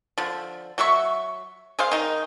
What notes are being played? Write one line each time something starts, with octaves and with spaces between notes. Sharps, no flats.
D3 F3
F#3 F#4 E5 C#6
G#4 C5 F5
D#3 D#4